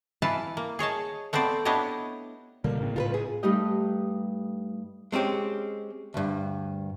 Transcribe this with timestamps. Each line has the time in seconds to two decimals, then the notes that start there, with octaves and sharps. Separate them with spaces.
0.22 E3 E4 B4 F5 A5
0.57 A#3
0.79 G#4 C#5 D#5 A5
1.33 A3 B3 C4 C5 D5
1.65 B3 D4 E4 G4 C#5 D#5
2.64 B2 D3 G3 A#3
2.81 A2 C#3 C4
2.96 F4 A#4 B4
3.14 G#4
3.43 G2 G3 A3 D#4 G4 D#5
5.12 G#3 C4 C#4 G4
6.14 D2 G2